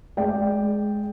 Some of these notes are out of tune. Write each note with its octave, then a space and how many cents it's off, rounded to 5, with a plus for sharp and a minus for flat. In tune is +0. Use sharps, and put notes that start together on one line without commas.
G#3 +10 D5 +0 G5 +0